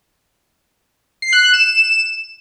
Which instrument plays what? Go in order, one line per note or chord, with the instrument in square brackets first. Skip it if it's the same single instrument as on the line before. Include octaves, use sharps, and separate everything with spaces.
[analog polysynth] C7
F#6
F#6
E7
E7